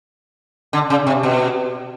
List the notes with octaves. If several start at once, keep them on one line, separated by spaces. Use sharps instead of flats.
D3
C#3
C3
B2